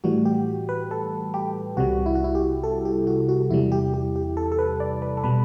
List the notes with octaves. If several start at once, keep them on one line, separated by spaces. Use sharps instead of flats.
A2 E3 G3 F#4
G4
B4
A4
G4
C2 C3 G3 F#4
E4
F#4
E4
G4
A4
G4
F#4
F#4
E2 C3 G3 E4
G4
G4
G4
A4
A4
B4
D5
B4
A4
B2 G3 B4